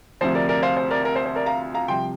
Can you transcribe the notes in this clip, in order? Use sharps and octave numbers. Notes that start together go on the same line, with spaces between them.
D2 C3 F3 C5
A#4 D5
A#4 D5
C5 F5
C5
A#4 D5
A#4
C5
C5
A#4 D5
F5 A#5
F5 A#5
C2 C3 F3 G5 C6